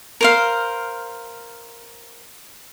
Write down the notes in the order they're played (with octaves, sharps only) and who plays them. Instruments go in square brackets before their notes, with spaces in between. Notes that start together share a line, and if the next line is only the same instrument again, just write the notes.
[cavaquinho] A#4 C5 F5